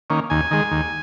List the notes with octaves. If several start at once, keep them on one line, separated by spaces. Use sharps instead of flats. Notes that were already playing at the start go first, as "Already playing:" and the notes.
D#3 A#3 C#4
D#2 G#5
D#3 G#3
D#2